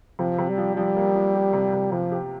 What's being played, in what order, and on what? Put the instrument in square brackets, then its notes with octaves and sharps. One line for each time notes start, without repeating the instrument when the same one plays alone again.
[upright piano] C3 [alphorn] F3
[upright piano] C3
[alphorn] G3
[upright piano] F3
[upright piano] F3 [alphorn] G3
[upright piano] A#3
F3
G4
C3
C3
[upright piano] C3 [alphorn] F3
[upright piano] G4